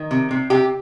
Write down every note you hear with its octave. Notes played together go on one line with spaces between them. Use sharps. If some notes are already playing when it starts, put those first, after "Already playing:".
Already playing: D#3
C3
C3
C3 G4